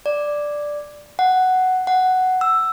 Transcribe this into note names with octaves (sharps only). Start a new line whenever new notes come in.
D5
F#5
F#5
E6